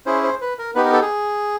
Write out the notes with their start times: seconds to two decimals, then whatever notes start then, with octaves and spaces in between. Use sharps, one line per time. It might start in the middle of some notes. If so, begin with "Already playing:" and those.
0.06 C#4 E4 G#4 C5
0.23 C5
0.41 B4
0.59 A#4
0.75 B3 D#4 G4 B4
0.85 A#4
0.93 A4
1.01 G#4